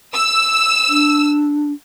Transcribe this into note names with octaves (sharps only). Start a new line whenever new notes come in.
E6
D4